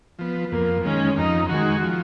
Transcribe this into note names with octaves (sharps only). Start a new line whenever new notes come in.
F3 B3
F2 A#3
D#3 G#3 C#4
F2 D#4
D#3 G#3 F#4
F3